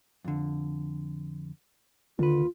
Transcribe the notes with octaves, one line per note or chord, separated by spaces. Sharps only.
F2 D3
D#2 D3 F4 B4